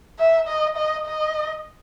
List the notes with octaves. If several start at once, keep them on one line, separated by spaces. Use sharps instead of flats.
E5
D#5
D#5
D#5